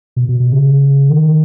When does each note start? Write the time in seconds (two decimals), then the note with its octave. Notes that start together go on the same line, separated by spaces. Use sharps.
0.16 B2
0.28 B2
0.40 B2
0.52 C#3
1.10 D#3